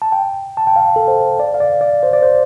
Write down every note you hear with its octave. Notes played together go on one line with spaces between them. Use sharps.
A5
G5
A5
G5
F5
A4
C5
D5
F5
D5
D5
C5
D5
C5